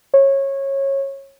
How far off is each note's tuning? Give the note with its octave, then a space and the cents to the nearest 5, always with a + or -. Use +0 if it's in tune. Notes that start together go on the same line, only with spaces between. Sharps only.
C#5 -20